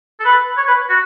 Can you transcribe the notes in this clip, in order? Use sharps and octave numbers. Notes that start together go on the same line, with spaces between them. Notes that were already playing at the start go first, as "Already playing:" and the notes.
A4
B4
C#5
B4
F#4